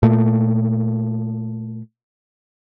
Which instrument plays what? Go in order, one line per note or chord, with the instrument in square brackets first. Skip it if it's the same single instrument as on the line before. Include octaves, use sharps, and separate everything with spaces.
[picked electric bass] A#2 A3